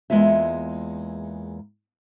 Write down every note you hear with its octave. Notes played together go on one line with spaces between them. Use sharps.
E2 G#3 A#3 F4 E5